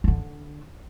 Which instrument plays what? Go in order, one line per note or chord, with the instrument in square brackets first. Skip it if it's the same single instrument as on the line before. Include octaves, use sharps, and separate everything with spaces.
[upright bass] D3 D4